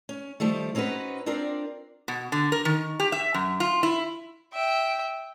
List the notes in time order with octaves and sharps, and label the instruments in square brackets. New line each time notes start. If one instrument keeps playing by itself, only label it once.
[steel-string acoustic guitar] C#4
D#3 F3 G3 A3
C4 C#4 D#4 F#4 B4
C4 D4 F4 A#4 D5
[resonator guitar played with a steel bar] B2
D3
A#4
D#3
G4
E5
F#2
F4
E4
[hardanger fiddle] E5 G5